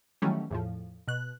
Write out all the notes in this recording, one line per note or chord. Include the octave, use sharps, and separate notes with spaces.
D#3 E3 F#3 G3 A3 C#4
E2 A2 F3
B2 F#6